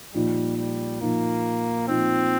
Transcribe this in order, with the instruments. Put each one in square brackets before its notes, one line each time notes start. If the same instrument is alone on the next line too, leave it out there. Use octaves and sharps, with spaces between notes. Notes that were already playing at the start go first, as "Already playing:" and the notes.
[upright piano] A#2 F3 D#4 [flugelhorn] G3
[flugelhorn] G3
[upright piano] A#2 F3 D#4 [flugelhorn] A#3
[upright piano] A#2 F3 D#4 [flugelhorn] C4